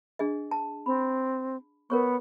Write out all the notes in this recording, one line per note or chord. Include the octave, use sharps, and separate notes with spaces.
D4 G#4 D#5
A5
C4 B5
B3 A#4 C#5 C#6